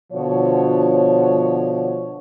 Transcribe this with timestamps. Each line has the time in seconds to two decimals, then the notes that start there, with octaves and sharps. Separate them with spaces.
0.13 B2 D3 F3 C#5